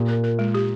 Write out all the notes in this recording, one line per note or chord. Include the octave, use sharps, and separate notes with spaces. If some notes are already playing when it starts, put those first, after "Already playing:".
Already playing: A#2 G4
A#4
A#4
G#3
G4